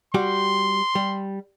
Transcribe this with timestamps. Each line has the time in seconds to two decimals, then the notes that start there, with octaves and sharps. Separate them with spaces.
0.14 G3 F#4 G4 C6
0.95 G3